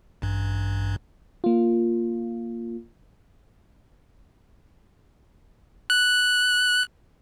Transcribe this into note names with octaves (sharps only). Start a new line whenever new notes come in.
A1 G2
A#3 F4
F#6